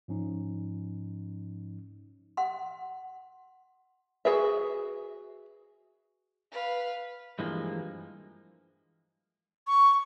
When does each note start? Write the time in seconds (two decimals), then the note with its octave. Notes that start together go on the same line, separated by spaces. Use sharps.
0.08 G#2 F3 C#4 D#4
2.37 F#5 C6
4.25 F#4 G#4 B4 E5
6.51 B4 F5
7.39 G2 E3 F3 G#3 A#3
9.67 C#6